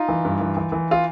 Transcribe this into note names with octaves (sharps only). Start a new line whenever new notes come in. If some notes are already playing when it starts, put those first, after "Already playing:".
Already playing: D#4 F4
E3
G2
E3
E3
E3
F4